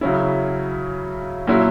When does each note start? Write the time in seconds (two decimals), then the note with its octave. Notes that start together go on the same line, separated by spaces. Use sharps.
0.01 C#3 F#3 C#4 E4
1.47 A#2 F#3 C#4 E4